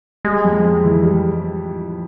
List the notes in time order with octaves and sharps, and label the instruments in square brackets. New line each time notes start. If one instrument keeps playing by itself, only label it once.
[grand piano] G3 [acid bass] G#3
[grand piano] F2
F2
E3
G3